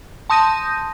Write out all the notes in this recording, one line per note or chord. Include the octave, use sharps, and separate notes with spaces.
A5 C6 D#6 G6 A#6 D#7